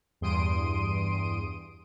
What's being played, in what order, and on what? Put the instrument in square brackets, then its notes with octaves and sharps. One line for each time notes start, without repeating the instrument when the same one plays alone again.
[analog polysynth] E2 G2 C6 D#6 D7 D#7